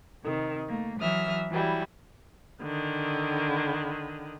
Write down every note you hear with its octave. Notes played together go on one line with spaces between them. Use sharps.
C3 D#3
A3 A#3
E3 F#3 E5 D#6 F6
E3 F#3 G3 E4
D3 D#3